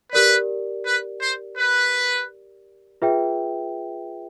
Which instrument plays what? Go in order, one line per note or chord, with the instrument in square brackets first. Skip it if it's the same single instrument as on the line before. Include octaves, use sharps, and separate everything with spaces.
[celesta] G4 A#4 D5 [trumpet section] B4
[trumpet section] B4
C5
B4
[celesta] F4 G#4 B4 E5 G5